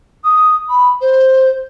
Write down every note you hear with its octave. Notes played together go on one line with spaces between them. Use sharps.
D#6
B5
C5